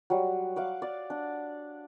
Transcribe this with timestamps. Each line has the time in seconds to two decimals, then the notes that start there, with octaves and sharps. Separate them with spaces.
0.10 F#3 G3
0.56 F5 F#5 D6
0.82 D5
1.10 D4